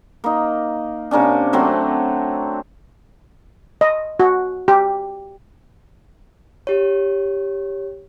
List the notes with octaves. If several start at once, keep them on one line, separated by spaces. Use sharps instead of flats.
A#3 D#4
C3 A#3 C#4 D4
F#3 A3 C4
D#5
F#4
G4
G4 C#5